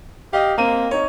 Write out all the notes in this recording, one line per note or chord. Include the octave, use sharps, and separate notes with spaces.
G4 D#5 F5
A#3 C4 D#7
D#4 C#5